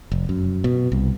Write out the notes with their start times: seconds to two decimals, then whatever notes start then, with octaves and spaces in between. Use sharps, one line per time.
0.12 F1
0.29 F#2
0.64 B2
0.92 C2